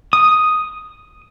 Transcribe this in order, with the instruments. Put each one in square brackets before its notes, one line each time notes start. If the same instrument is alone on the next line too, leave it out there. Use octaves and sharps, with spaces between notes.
[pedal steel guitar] D#6